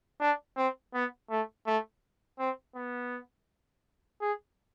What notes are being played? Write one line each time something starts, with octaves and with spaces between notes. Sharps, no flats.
D4
C4
B3
A3
A3
C4
B3
G#4